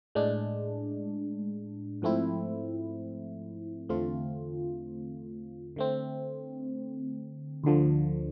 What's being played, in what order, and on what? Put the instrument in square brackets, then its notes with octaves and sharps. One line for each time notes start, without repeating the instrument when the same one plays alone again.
[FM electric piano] A2 G#3 D4
G#2 F3 A3 C4 E4
E2 D3 A3 C4 F4
D3 A3 C4
D2 D3 F3